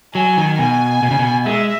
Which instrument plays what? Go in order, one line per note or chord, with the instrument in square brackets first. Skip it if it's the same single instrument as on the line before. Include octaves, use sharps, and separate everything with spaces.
[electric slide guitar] F#3 [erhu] G#5
[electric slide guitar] D#3
[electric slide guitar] B2 [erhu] G#5
[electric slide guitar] B2
C#3
B2
[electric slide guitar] G#3 [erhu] E5